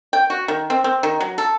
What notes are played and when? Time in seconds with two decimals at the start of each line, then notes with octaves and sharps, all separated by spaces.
0.13 G5
0.30 F#4
0.48 D#3
0.70 C4
0.84 C4
1.03 D#3
1.20 F#3
1.38 A4